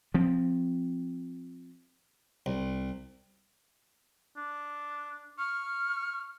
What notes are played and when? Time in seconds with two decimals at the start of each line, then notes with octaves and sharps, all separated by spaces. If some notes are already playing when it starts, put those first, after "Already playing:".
0.14 F3 C4
2.46 C2
4.37 D4
5.39 C#6 F6